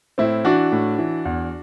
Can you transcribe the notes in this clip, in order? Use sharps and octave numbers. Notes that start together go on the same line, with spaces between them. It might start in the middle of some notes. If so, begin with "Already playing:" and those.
A2 C4 E4
E3 D4 F#4
A2
E3
E2